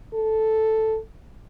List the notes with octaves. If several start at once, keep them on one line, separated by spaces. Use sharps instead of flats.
A4